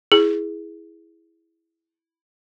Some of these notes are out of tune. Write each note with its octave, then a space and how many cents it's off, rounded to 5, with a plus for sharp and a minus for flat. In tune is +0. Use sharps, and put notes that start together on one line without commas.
E4 +0 G#4 +0